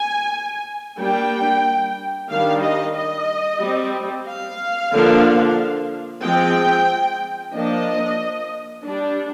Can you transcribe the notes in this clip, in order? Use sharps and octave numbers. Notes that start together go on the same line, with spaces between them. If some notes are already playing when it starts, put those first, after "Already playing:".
Already playing: G#5
G3 A#3 D4 G5
D#3 G3 D4 F5
D#5
D#5
G3 C4
F5
D3 F3 A#3 D4
F3 G#3 C4 G5
F3 A#3 D4 D#5
G3 D4